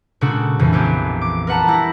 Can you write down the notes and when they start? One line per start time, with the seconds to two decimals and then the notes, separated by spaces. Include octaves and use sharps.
0.21 A#2 C#3 G#3 D4 F#4 A4
0.59 F2 C#3 E3
0.73 A#1 B3 G4 G#5
1.21 D6
1.47 A#4 B4 F#5 A5
1.67 G3 E4 A#6